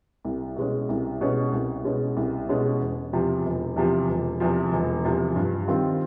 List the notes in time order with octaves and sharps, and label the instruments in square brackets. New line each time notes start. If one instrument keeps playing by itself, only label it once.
[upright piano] C2
B2 G#3 C#4
C2
B2 G#3 C#4
C2
B2 G#3 C#4
C2
B2 G#3 C#4
E1
E2 C3 F3
E1
E2 C3 F3
E1
E2 C3 F3
E1
E2 C3 F3
G2
D#3 G3 C4 F4